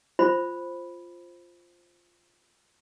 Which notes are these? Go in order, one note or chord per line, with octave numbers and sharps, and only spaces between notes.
F4 C5 B5